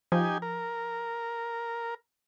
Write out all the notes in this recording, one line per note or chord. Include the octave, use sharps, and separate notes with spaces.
F3 D#4 G4 G#5
A#4